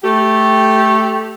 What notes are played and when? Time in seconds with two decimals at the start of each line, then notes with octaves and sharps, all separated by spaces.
0.04 A3 G4